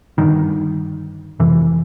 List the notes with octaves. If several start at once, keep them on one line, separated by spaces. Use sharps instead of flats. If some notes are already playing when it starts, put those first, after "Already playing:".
G2 D3 D#3
F2 C3 E3